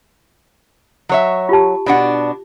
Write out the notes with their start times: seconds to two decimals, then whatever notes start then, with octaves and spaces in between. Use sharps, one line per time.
1.09 F#3 C#5 E5
1.49 F4 G4 A5
1.86 B2 D4 F#5